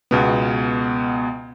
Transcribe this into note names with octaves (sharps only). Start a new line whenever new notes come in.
C#2 B2 B3